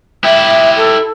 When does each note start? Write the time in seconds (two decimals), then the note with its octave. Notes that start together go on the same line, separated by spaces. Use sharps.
0.24 E4 G4 E5
0.76 A4